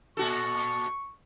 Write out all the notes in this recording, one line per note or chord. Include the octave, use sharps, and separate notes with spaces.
A#2 F#4 A4 C#6